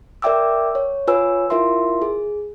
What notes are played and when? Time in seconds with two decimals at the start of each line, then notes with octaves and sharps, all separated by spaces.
0.22 A#4 D5 E5 G5 D6 E6
0.75 C#5
1.07 F4 B4 C#5 G#5 E6
1.50 E4 F4 A#4 E5 C6
2.02 G#4